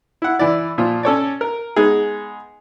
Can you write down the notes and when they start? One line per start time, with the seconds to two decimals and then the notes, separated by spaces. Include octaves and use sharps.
0.22 E4 F#5
0.39 E3 E4 D5
0.78 A#2 F3 F4
1.03 C#4 A4 C#5 D5
1.41 A#4
1.76 G#3 B3 D#4 G#4